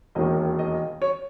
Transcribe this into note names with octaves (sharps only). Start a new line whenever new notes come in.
E1 D#2 D#3 D#5
D#5
C#5